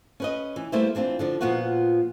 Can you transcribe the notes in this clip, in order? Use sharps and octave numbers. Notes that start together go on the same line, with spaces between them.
C#4 B4 D#5
E3
G3 A3 A#3 E4 B4 C5
E3 C4 D4 F4
D3 F3 D4
A#2 F3 B3 F4 F#4